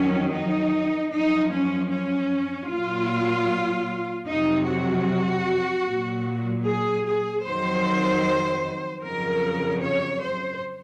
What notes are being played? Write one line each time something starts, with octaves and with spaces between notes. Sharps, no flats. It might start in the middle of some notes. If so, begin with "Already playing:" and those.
Already playing: F2 D#3 F#3 C#4
D#4
F#2 F3 D#4
C#4
C#4
A#2 F#3 F4
F2 C3 F#3 D#4
F#4
A#2 F#3
G#4
G#4
F2 D#3 F#3 C5
F2 C#3 F#3 A#4
C#5
C5